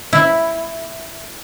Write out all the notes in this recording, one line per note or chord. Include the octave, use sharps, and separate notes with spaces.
E4